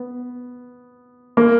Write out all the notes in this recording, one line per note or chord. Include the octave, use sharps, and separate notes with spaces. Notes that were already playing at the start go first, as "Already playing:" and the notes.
Already playing: B3
A#3